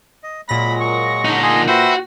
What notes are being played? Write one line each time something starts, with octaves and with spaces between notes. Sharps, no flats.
D#5
A#2 F#3 G#3 B5 A#6
C#6
D3 D#4
G#4 G#5 C6
F#4 B4 C5 E5 G5